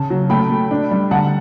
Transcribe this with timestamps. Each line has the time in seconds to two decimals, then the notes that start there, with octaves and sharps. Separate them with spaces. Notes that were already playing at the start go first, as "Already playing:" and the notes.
Already playing: C#3 A5
0.10 F#3
0.30 A3 G5 B5
0.50 A3
0.71 D4
0.91 G3
1.11 D3 F#5 A5